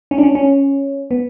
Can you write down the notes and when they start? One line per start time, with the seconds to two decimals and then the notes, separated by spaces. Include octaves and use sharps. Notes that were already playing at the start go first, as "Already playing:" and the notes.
0.11 C#4
0.18 D4
0.23 C#4
0.35 C#4
1.11 B3